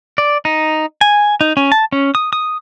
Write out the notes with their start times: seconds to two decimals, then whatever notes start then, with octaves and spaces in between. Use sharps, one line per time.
0.18 D5
0.45 D#4
1.01 G#5
1.41 D#4
1.57 C#4
1.72 A5
1.92 C#4
2.15 D#6
2.33 D#6